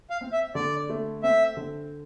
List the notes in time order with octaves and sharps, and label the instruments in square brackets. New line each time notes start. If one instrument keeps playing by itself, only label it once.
[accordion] F5
[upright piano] C4
[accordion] E5
[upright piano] D3 [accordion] D5
[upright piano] A3
[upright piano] C4 [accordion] E5
[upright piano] D3